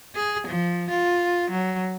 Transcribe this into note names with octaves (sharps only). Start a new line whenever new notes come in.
G#4
F3
F4
F#3